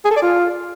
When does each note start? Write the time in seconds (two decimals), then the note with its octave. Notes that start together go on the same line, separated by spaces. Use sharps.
0.05 G#4
0.11 A4
0.16 D5
0.22 F4